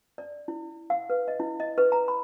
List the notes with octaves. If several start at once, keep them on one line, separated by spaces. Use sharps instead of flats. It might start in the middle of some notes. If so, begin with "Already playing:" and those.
D5
E4
F5
B4
D#5
E4
D#5
B4
A#5
B5